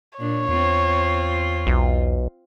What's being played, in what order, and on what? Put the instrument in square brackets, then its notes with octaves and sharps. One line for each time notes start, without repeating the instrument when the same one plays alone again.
[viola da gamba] A#2 D4 [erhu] C#5
[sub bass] E2 [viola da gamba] C4 F4
[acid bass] B1